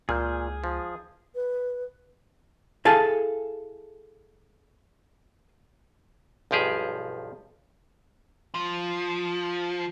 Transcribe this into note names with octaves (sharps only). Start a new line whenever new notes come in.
C#2 A#2 G#4 F6 G6
F3
B4
E4 G#4 A4 F5 G#5 A5
B1 G2 F3 G4 G#4
F3